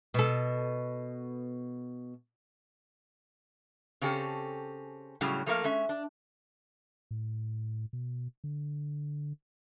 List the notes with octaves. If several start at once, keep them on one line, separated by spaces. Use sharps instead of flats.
B2 A4
C#3 C4 C#4 G4 A4
A2 C#3 F#3 G3
F3 A3 A#3 A#4 F5
G#3 C#4 E5
D4
A2
B2
D3